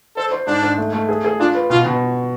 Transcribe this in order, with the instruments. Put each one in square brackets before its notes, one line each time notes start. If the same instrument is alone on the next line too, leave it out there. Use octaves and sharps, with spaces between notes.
[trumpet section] A4 [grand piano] C5
[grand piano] C5
[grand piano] G#2 [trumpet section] D4
[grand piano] G#2
A3
A3
G#4
G#4
[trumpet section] D4 [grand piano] F4
[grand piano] B4
[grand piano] B2 [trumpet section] F4
[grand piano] B2